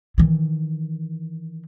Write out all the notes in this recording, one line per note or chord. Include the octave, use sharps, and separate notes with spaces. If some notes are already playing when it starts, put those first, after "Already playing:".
D#3 E3